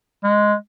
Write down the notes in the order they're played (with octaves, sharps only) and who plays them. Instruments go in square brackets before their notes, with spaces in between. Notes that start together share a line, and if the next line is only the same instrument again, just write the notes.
[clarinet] G#3